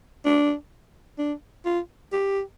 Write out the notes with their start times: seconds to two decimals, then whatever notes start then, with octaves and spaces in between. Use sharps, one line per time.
0.25 D4
1.18 D4
1.65 F4
2.12 G4